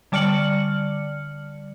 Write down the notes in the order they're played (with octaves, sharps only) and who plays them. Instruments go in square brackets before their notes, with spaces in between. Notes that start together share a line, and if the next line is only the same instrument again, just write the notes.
[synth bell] D3 G3 D5 F6 C#7 F#7